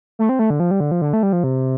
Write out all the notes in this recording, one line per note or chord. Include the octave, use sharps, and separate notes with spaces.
A3
C4
A3
D3
F3
G3
D3
F3
D3
A3
G3
F3
C3